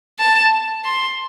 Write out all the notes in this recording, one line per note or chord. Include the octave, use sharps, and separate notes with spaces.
A5
C6